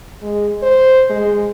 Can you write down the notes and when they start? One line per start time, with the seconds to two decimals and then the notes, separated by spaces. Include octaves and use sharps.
0.23 G#3
0.63 C5
1.10 G#3